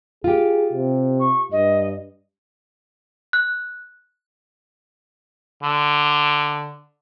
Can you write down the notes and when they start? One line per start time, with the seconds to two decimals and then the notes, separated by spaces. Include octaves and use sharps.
0.24 F4 G4 G#4
0.73 C3
1.20 C#6
1.52 G2 D#5
3.33 F#6
5.63 D3